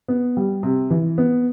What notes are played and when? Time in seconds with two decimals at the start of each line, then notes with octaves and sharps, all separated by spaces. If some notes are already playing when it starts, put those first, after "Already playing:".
0.08 B3
0.37 G3
0.63 C3
0.90 E3
1.18 B3